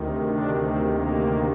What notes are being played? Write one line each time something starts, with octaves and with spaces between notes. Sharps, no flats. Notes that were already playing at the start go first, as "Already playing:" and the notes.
Already playing: D2 C3 D#3
D4
C4
A#3